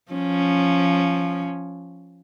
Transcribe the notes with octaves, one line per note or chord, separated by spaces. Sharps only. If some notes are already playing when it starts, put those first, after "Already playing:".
F3 C#4